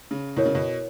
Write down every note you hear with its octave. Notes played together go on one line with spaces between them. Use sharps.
C#3
B2 E4 A#4 C#5
C#3
B2